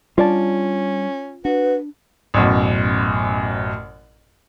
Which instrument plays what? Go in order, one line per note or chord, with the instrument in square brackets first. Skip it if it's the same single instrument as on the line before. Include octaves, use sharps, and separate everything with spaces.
[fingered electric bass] G3 D4 [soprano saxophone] C#4 [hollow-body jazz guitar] F4 D5 A5
[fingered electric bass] D4 [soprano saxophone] F#4 [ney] B4
[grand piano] A1 F#2 B2